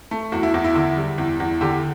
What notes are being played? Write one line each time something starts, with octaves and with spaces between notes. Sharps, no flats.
A3
E2 F#4
E4
E2
E4
D3
G3
E2
E2
D3 G4